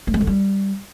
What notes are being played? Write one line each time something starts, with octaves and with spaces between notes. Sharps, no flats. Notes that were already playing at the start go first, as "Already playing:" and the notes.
A3
G#3
D3
G3